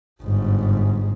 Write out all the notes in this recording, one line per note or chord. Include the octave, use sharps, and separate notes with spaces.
G1 G#2